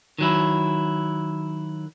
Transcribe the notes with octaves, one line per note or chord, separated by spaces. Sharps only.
D#3 F#3 E4